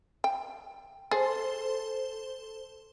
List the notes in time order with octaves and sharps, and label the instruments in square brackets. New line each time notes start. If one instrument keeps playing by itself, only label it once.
[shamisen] G5
[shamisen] G#4 [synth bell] A4 C5